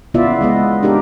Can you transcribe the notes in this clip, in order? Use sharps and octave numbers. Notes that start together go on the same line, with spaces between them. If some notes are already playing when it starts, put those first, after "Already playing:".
C#3 B3 E4 F4 D5 E5
G#3 B3 D#5
D4 D#4 G4 A#4